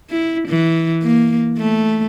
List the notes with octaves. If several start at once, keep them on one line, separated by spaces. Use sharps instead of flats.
E4
E3
A#3
A3